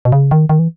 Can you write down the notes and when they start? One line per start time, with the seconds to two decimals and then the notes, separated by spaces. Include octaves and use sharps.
0.05 B2
0.12 C#3
0.31 D#3
0.49 D#3
0.59 E3